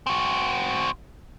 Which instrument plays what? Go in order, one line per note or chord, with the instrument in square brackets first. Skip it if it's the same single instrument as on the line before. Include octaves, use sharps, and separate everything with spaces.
[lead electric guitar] C4 F#4